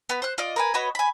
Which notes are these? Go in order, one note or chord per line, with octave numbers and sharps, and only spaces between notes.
B3 B4
C5 F#6
F4 D5 D#5
A#4 B4 G#5
F#4 B4 C#5 D#5
G#5 B5